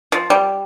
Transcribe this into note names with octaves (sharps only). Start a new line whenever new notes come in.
F3
G3